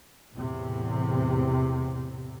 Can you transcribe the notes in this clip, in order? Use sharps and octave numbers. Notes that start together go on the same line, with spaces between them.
E2 A2 C3